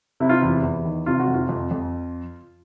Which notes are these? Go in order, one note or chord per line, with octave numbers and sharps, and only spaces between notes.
C3 E4
F4
E2 E4
E2
D#3
C3 F4
F#4
F2
F4
F2
F2